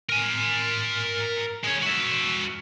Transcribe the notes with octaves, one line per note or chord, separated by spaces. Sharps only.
A#4 G#5
G#3 C#5
F#4 E5